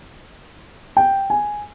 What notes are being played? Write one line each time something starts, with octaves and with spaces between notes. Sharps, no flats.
G5
G#5